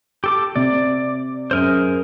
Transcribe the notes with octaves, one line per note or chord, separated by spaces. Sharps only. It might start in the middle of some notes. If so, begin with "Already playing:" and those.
G4 A4 D6
C3 D5
F#2 G#4 A#4 C5